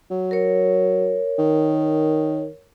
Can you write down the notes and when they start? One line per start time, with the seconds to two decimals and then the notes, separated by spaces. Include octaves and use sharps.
0.11 F#3
0.31 A#4 C#5
1.38 D#3